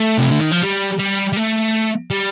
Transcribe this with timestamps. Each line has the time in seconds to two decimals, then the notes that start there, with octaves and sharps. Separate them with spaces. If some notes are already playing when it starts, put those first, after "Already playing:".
Already playing: A3
0.19 C3
0.30 D3
0.40 D#3
0.52 F3
0.63 G3
0.99 G3
1.33 G3
1.37 A3
2.11 G3